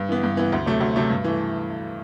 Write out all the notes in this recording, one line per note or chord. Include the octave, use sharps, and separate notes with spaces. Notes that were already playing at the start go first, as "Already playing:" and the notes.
Already playing: G2
E3 B3
G2
E3 B3
D2
C3 F#3 A3
D2
C3 F#3 A3
G2
E3 A3